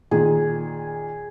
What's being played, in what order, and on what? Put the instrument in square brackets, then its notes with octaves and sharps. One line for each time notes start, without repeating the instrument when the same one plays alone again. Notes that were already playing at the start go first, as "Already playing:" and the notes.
[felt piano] A#2 D#3 [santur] G#4